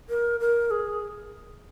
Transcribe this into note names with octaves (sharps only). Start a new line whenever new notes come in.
A#4
A#4
G#4